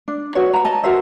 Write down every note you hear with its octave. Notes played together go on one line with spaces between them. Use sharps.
D4
F#4 B4 C#5
A#5 B5
D#5 A5
F#4 A#4 C5 E5